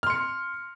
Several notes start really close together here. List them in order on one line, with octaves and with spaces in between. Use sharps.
F6 C6 C#7